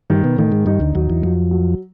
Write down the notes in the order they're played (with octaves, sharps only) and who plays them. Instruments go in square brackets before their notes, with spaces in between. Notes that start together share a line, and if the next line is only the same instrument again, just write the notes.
[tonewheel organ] G2 G3 [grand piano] D#3
[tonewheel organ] B2 B3
[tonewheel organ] A2 A3 [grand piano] D#3
[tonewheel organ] G#2 G#3
[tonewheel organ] G2 G3 [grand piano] D#4
[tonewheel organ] D2 D3
[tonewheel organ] D#2 D#3 [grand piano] F#3
[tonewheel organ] E2 E3
[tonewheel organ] F2 F3 [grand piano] F#3
[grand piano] F#3